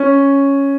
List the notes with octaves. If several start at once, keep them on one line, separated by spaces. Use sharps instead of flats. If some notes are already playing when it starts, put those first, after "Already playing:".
Already playing: C#4